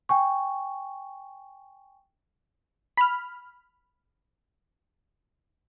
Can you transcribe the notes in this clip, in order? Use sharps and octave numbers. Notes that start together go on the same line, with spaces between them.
G5 G#5 C#6
B5 F6